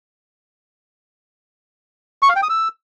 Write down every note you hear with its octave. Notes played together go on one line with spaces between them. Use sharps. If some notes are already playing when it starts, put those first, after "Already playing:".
C#6
F5
G5
D#6
E6